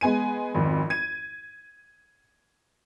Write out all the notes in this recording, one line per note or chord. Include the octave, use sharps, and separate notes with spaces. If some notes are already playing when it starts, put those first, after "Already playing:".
G#3 B3 G#5 D#7
G#1 F2
G#6 D#7